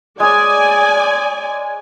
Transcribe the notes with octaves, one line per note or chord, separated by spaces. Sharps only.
G#3 C#5 D5 G#5